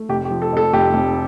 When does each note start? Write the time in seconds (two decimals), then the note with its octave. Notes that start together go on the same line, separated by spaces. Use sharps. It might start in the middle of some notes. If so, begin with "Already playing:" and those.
Already playing: A3
0.09 F1 G4
0.25 G4
0.31 F3
0.42 A4
0.52 F2 A4
0.73 F1 G4
0.94 F1